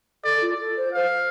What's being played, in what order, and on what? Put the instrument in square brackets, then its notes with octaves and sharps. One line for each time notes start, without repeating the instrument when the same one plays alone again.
[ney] A4 [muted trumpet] D5
[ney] F4
A4
C5
[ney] C5 [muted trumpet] F5